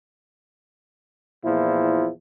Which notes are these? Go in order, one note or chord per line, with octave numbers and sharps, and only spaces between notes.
E2 A#2 F3 E4